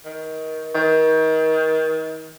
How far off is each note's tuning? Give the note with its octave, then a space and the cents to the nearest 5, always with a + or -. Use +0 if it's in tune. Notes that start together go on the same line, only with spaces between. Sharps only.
D#3 +25
D#3 +35